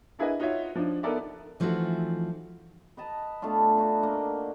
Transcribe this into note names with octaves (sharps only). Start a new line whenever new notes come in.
D4 E4 G#4 A#4 B4 D#5
D#4 F4 F#4 C#5 E5
F3 D4 D#4
B3 D#4 A4 A#4 D5 E5
E3 F3 A3 C4 D#4 F#4
B4 D#5 A5 A#5
A3 B3 D4 F4
D4 D#4 F#4
A#3